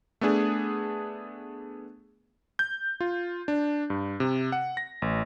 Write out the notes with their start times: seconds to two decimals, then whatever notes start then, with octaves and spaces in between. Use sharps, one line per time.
0.21 A3 B3 D4 G#4
2.59 G6
3.00 F4
3.48 D4
3.90 G2
4.20 C3
4.52 F#5
4.77 A#6
5.02 A1